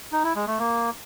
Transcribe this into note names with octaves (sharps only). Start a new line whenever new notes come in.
D#4
E4
G#3
A3
A#3